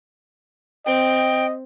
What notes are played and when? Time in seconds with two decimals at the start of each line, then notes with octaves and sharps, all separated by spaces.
0.86 C4 D#5 G5